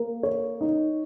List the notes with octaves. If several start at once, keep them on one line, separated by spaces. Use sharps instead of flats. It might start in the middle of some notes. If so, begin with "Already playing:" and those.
Already playing: A#3 A#4
C#5
D#4